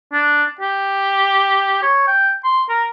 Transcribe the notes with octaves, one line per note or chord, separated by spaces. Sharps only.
D4
G4
C#5
G5
C6
A#4